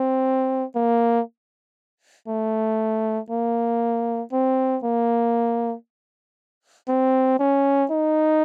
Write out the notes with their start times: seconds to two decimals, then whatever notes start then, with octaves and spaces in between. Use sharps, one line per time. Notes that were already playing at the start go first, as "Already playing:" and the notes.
Already playing: C4
0.75 A#3
2.28 A3
3.30 A#3
4.32 C4
4.84 A#3
6.88 C4
7.39 C#4
7.91 D#4